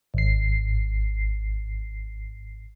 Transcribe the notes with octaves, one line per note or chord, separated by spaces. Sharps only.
G#1 C7